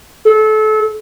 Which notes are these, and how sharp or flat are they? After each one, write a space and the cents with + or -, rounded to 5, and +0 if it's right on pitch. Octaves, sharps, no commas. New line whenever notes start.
A4 -30